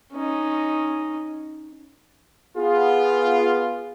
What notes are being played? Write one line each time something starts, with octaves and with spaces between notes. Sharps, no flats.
C#4 D#4
B3 F4 G#4